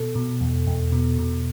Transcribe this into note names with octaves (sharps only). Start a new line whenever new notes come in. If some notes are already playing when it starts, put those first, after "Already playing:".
Already playing: B2 A4
B2
E2
E2
B2
B2